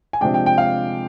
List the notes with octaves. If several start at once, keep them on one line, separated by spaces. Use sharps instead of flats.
G#5
C3 F3 G#3 D4 G5
G5
G5
F5